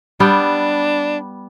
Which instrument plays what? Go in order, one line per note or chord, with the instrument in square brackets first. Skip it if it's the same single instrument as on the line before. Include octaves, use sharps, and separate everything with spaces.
[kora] G3 B3 [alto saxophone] D4